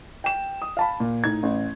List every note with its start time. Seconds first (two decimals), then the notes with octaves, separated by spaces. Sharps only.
0.24 G5 E7
0.62 D#6
0.77 F5 A5 B5
1.00 A#2
1.24 A2 D#4 G#6
1.43 A1